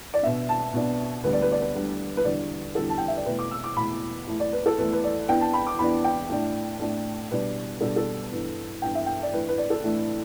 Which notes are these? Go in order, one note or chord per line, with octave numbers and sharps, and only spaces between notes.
D5
B2 B3 D4 E5
A5
B2 B3 D4
D2 D3 G3 B3 B4
D5
B4
D5
B4
D2 D3 G3 B3
B4
E2 D3 G3 D5
E2 D3 G3 A4
A5
G5
E5
D5
E2 B2 A3 B4
D6
E6
D6
E2 B2 A3 B5
E2 E3 A3
D5
B4
A4
E2 E3 A3 B4
B4
D5
E2 E3 B3 D4 G5
A5
B5
D6
E2 E3 B3 D4 B5
G5
A2 A3 D4
A2 A3 D4
B2 G3 D4 B4
B2 G3 D4 A4
A4
G2 E3 B3
G2 E3 B3 G5
E5
G5
D5
A2 E3 A3 D4 B4
B4
D5
A4
A2 E3 A3 D4